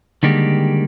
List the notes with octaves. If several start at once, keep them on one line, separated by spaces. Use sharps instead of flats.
D3 D#3 G3 G#3 A#3 G4